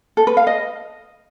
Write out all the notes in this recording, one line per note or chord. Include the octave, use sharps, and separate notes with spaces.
A4
B4
F5
D#5